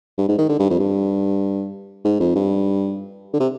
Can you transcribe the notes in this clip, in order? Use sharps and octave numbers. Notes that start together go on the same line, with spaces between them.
G2
G#2
D#3
D3
G2
F2
G2
G#2
F2
G2
D3
C3